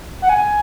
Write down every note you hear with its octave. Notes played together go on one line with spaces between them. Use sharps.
F#5
G#5